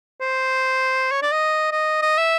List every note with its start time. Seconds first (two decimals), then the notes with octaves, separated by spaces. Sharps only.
0.21 C5
1.12 C#5
1.22 D5
1.32 D#5
1.72 D#5
2.02 D#5
2.18 E5